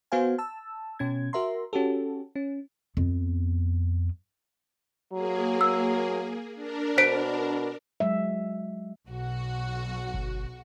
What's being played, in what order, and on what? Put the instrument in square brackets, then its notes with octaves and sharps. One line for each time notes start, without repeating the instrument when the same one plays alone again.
[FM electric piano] B3 F#4 C5 F5 G#5
A5 E6
B2 C#4 G#6
F#4 A#4 E5 A#5 C6
C#4 F#4 G4 A4
C#4
[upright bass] F2 B3
[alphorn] F#3 [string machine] A#3 G#4
[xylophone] E6
[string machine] D4 A#4
[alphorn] B2 [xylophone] C5 B6 D7
[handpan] F#3 G#3 E5
[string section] B1 F#4
[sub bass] G1